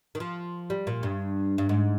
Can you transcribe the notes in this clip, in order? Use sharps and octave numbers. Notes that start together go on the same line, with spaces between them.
D#3
F3
G3
A#2
G2
G2
G#2